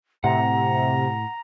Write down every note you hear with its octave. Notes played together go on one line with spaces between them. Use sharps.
A2 C3 F#5 A#5